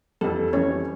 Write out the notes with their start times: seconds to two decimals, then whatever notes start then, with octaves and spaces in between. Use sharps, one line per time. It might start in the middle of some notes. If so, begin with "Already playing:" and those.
0.21 F2 E3 G3 A4
0.53 F2 E3 G3 C#4 C#5